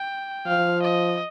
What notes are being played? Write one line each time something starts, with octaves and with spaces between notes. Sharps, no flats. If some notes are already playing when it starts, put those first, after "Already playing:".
Already playing: G5
F3 F5
D#5